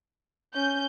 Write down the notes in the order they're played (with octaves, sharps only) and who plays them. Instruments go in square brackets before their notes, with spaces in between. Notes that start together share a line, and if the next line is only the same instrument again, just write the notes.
[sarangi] C#4 [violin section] G6